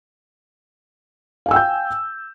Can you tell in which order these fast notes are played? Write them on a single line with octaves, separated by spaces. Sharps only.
F5 G#5 E6 G5 G6